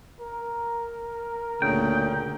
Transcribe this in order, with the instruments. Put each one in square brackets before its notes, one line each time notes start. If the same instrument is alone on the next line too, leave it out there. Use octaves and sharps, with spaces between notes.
[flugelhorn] A#4
[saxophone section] D2 A#2 C#3 [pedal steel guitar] G5